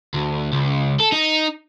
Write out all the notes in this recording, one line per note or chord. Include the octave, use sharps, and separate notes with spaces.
D2
C#2
A4
D#4